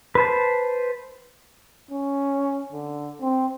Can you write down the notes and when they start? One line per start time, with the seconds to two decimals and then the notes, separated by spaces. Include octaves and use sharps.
0.15 B4 C5 A5
1.91 C#4
2.72 D3
3.21 C4